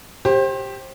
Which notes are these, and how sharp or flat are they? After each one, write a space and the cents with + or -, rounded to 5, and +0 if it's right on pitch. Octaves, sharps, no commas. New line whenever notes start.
G4 +0 C5 +30